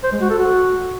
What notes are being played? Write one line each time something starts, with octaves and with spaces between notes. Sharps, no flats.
C5
G#3
F#4
A4
F#4